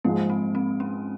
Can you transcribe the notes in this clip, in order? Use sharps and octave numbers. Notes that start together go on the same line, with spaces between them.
G#2 F3 G#3 A#3
C4
C4
C#4